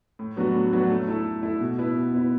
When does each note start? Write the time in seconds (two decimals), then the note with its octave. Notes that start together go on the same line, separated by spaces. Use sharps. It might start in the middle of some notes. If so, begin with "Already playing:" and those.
0.19 A2
0.37 F#3 B3 D4 F#4
0.54 A2
0.73 F#3 B3 D4 F#4
0.89 A3
1.08 E4 A4
1.25 A3
1.43 E4 A4
1.60 B2
1.78 B3 E4 B4
1.96 B2
2.14 B3 E4 B4